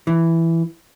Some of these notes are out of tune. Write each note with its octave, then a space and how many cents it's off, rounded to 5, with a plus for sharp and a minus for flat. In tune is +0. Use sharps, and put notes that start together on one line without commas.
E3 +5